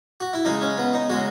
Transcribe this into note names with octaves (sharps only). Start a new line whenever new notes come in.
F#4
E4
C#3 G#3 D#4
C#4
B3
D#4
C#3 G#3 F#4